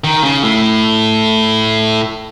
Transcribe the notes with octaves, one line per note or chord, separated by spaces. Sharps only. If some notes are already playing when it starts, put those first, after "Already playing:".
D#3
C#3
A2